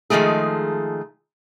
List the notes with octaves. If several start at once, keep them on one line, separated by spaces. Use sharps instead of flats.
D#3 F3 G#3 A3 G#4